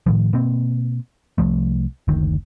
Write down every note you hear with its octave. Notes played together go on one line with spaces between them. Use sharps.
A2 D#3 F3
B2 A#3 C4
C2 F3 A3
F#1 D2 D#3